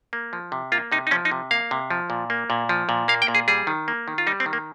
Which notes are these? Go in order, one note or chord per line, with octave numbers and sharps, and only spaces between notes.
A#3
F3
C3
A#3 F4
C3 D#4
D#4
F3 C#4
D#4
C3
A#3 F5
C3
F3
A#2
A#3
A#2
F3
A#2
A#3 F5
G5
A#2
G#4
G3 G#4
D#3
A#3
D#3
F4
G3 D#4
C4
D#3
A#3